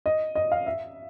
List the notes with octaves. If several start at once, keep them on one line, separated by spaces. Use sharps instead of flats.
D#5
D#5
F5
E5